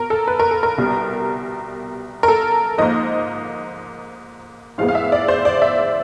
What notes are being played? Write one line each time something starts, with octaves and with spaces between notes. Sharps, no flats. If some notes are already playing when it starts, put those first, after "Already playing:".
Already playing: B2 A#4
A4
B4
A#4
A4
A#4
C2 B2 G3
A#4
A4
G#2 F3 A#3 D#5
A2 F3 G#3 B3 F5
F5
E5
D5
C5
D5
E5